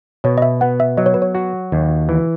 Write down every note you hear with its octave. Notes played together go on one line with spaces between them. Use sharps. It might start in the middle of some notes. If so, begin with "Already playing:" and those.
B2 C#5
D#5
E5
B3 F#5
E5
F#3 D#5
C#5
B4
C#5
F#4
D#2
E3